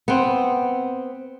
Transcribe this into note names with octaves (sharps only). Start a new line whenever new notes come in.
B3 C4